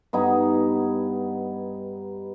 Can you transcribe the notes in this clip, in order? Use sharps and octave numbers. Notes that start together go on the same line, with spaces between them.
G2 B3 D#4 G#5